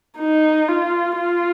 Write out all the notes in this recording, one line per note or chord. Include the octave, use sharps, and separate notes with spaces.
D#4
F4
F4